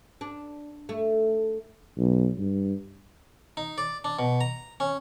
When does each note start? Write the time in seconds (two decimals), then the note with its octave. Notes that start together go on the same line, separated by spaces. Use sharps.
0.21 D4
0.89 A3
1.98 B1
2.38 G2
3.57 D#4
3.78 D5
4.04 D4
4.19 B2
4.41 A#5
4.80 C#4